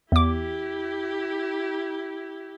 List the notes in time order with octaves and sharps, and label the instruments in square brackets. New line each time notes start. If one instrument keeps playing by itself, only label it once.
[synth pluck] E2 D6 [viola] E4 G4